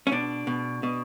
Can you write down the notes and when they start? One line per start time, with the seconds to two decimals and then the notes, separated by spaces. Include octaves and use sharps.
0.07 C#4
0.12 B2 D4
0.47 B2
0.83 B2